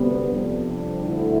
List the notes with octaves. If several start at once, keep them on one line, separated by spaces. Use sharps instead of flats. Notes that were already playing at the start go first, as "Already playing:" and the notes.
Already playing: D2 C3 G3 B3
F2 C3 G3 D4
D2 D3 A3 E4